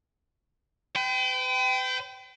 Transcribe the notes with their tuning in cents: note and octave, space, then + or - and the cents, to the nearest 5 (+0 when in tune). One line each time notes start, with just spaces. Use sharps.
B4 +45 G5 -15